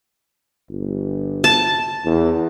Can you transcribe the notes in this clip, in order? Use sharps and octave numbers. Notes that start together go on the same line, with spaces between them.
G1
A5
E2